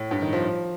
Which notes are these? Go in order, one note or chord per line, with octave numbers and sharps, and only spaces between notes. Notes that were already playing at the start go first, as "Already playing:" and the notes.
Already playing: A2
G2
D#3
F3